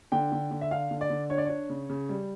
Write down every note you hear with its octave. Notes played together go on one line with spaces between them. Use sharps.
D3 G5
D3
D3
E5
D4 F5
D3
D5
D3
D4 C#5
D5
D4 C#5
C#3
C#3
G3